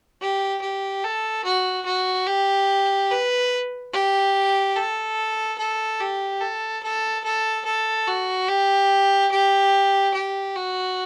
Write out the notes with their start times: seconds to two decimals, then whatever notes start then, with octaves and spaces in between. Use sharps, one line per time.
0.21 G4
0.62 G4
1.04 A4
1.45 F#4
1.86 F#4
2.27 G4
3.11 B4
3.93 G4
4.76 A4
5.58 A4
6.00 G4
6.41 A4
6.83 A4
7.24 A4
7.65 A4
8.08 F#4
8.49 G4
9.32 G4
10.14 G4
10.56 F#4